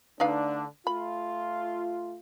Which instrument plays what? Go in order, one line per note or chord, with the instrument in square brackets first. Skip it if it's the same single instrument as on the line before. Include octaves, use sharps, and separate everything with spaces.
[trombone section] D3 A3 D4 [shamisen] D#4 B4 F5
[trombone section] A3 F4 [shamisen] B5